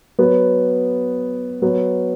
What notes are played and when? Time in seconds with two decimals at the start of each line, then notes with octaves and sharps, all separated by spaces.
0.18 F#3 B3
1.62 F#3 B3